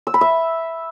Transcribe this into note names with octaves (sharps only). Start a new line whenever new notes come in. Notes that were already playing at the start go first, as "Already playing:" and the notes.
E6
B5
E5